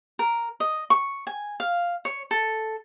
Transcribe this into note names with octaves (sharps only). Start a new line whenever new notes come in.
A#4
D#5
C#6
G#5
F5
C#5
A4